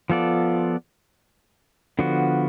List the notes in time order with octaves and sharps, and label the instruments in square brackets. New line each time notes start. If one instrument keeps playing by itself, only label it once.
[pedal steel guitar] F3 B3 F4 A4 D5
D3 F3 B3 F#4